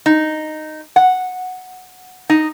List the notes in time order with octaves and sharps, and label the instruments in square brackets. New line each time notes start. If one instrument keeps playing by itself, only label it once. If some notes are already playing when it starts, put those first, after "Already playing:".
[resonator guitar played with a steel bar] D#4
F#5
D#4